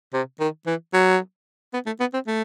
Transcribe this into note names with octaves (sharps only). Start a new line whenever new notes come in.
C3
D#3
E3
F#3
B3
A3
B3
C4
A3